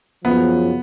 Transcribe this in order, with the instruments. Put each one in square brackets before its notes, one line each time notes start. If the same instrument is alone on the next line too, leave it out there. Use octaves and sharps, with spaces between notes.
[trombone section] F#2 C#3 F3 [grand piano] B3